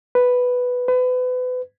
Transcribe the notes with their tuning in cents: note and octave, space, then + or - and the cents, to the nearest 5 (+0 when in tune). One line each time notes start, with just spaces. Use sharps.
B4 +0
B4 +30